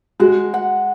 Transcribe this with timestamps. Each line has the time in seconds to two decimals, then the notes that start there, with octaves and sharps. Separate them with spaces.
0.20 G#3 F#4
0.54 F#5